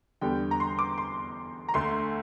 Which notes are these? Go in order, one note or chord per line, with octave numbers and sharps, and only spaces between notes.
E2 D3 G3 G5
A#5
C6
D6
C6
A#5
D2 D3 A3 C6